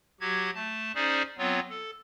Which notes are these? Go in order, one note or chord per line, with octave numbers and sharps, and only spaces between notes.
F#3 F#4 G4 G#6
A3 A5
C#4 D#4 G#4 C5 D5
F#3 B3 C4 F4 C#5
A4